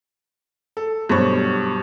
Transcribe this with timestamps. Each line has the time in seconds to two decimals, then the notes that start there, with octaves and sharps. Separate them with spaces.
0.77 A4
1.09 G2 B2 F#3 C5 C#6